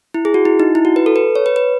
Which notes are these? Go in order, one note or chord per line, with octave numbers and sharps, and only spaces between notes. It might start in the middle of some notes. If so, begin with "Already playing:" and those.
E4
G#4
F#4
E4
D#4
E4
F#4
B4
A4
B4
C#5
B4
B4